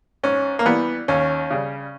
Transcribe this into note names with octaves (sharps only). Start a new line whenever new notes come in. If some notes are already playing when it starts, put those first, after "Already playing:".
G#2 C#4
A#3
E3 G3 B3
D#2 C#4
C#3 G3